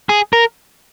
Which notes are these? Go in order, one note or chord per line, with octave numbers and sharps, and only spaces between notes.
G#4
A#4